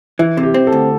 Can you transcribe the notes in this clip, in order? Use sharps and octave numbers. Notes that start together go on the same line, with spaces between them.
E3 E4
C3
G4
C4
A4
D2